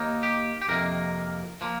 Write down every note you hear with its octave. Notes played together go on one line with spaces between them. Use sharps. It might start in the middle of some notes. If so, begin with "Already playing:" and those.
Already playing: D#2 D#3 A#3 D#4
G4
G4
F2 C3 D#3 A#3 A#4
F3 A#3